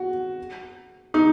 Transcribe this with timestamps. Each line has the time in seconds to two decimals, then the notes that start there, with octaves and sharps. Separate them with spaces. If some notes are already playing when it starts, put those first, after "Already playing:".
Already playing: F#4
1.14 D#4